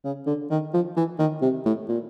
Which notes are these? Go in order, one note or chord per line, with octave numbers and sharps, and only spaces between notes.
C#3
D3
D#3
F3
E3
D#3
C3
A2
A#2